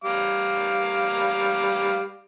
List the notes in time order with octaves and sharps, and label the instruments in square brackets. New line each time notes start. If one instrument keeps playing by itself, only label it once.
[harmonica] G3 F5 D6